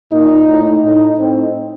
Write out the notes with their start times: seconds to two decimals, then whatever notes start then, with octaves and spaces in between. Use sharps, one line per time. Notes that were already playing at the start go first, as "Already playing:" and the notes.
0.12 A#2 D#4
0.48 A2
0.83 A2 D#4
1.19 A2 C4